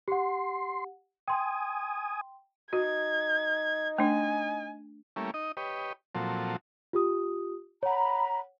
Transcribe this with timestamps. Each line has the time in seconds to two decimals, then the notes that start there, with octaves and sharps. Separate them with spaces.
0.08 G4 F#5 C6
1.28 G5 G#5 C6 D#6
2.73 D#4 F#4 G#6
3.98 A3 D4 G#5
5.16 G3 A3 A#3 C#4 E4
5.34 D#4 D#5
5.57 G4 B4 C#5 D#5
6.15 A#2 F3 F#3 C4 A4
6.93 F4 G4 D#6
7.83 C#5 F#5 A#5 B5